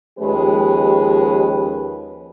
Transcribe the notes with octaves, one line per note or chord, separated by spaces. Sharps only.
D#2 F3 G#3 C#4 G4 B4